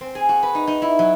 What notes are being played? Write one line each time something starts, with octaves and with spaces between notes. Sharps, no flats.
C4
G#4
F#4
B4
D#4
D#4
E4
F#3